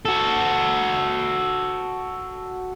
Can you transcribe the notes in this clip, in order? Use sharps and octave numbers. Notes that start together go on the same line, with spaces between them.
F#4 A4